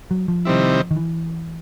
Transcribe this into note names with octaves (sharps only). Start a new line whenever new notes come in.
F#3
F3
C3 D#3 G3 C4 E4
D#3
E3